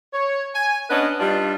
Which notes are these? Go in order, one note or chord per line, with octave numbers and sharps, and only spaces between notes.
C#5
G#5
B3 C#4 D4 B4 D#5
G2 G3 D4 D#4 F4